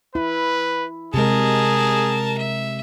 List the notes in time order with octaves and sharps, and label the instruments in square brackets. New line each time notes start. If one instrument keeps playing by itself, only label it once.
[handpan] E4 [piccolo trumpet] B4
[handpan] C3 G#3 [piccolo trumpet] G#4 [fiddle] A#4 A5
[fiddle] E5